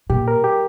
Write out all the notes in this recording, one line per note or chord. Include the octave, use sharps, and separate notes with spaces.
A#2 G4
A#4
G4